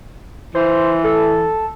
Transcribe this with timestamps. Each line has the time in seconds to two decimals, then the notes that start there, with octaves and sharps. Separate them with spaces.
0.55 E3 C5
1.04 A4